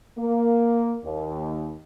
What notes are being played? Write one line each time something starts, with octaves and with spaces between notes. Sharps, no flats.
A#3
D#2